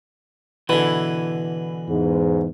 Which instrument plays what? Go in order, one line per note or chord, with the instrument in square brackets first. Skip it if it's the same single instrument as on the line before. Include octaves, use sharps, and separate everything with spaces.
[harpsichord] B2 D3 [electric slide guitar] E3 B4
[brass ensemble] E2 G#2